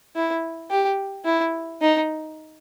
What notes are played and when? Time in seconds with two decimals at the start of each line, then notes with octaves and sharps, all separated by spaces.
0.16 E4
0.71 G4
1.25 E4
1.82 D#4